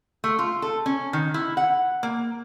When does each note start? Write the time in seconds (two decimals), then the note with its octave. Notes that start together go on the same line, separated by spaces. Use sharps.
0.24 A3
0.39 F4
0.62 A4
0.86 C#4
1.13 D#3
1.34 E4
1.57 F#5
2.03 A#3